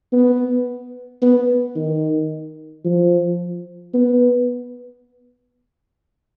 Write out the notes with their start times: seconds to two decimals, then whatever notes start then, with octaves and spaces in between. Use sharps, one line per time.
0.13 B3
1.22 B3
1.76 D#3
2.85 F3
3.94 B3